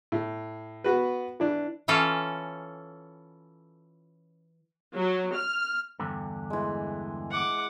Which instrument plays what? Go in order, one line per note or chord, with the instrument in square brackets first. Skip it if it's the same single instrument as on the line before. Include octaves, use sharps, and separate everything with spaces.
[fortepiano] A2
B3 F#4 B4
E3 D4
[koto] E3 C#4 F4 A4
[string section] F#3
F6
[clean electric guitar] E2 G2 D3
[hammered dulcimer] E3 G#3
[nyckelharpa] F#5 D6